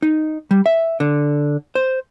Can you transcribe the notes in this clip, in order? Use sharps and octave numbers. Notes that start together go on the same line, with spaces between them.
D#4
G3
E5
D3
C5